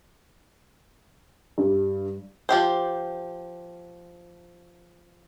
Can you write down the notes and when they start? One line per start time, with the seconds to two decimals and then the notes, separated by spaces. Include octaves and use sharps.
1.58 G2
2.49 F3 G4 C5